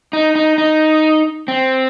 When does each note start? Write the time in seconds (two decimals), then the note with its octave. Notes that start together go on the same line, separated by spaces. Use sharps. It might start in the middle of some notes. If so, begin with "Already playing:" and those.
0.13 D#4
0.35 D#4
0.58 D#4
1.48 C4